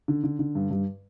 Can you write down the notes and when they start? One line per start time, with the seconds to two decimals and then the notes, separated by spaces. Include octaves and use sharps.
0.08 D3
0.24 D3
0.39 D3
0.55 G2
0.70 G2